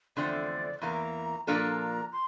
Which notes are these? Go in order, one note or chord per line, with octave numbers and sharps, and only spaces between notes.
E2 D3 F3 A3 C4 D5
E2 E3 A#3 A#5
A#2 F3 A#3 D4 A4 A#5
C6